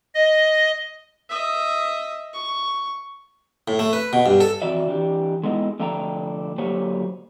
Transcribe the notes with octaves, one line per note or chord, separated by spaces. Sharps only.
D#5
D#5 E5
C#6
A2
A3
B4
B2
G2
A4
F2 E3 F#4 D5 E5
E3 D4 G4
G#3 A3 B3 C#4 D#4 E4
D3 F3 A3 D4 G5 A#5
D3 F#3 A#3 G4 C5 C#5